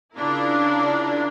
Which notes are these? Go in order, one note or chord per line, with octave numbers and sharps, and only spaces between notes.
C#3 D4 E4 F4 A#4